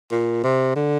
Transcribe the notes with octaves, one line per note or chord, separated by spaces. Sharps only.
A#2
C3
D3